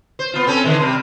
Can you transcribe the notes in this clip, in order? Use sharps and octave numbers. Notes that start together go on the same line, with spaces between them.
C5
B3 F4
C4 C#4 A4
D3 D#3 G#3
C3 G3